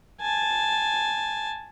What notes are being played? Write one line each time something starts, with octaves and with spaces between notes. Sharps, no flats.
G#5 A5